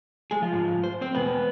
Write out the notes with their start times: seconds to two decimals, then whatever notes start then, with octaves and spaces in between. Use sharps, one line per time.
0.31 G#3 G#4
0.42 F3 F4
0.53 G#2 G#3
0.84 C5
1.01 C4 C5
1.15 E2 B2 G#3 B3 B4